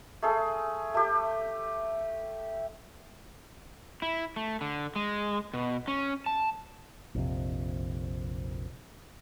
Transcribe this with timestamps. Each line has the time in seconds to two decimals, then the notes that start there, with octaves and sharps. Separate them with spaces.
0.23 A3 G#4 C6
0.94 A3 G4
4.02 E4
4.36 A3
4.61 D3
4.96 G#3
5.54 B2
5.88 C#4
6.26 A5
7.15 A#1 F2 C3